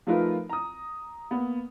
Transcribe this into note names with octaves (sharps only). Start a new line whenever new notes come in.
F3 A3 D#4 F4 A#4 B4
A#5 D#6
A#3 B3